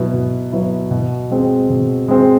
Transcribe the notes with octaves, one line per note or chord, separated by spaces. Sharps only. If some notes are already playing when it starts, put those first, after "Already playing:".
Already playing: B2 F#3 B3 E4
B2
F#3 B3 E4
B2
G#3 C4
B2
G#3 C4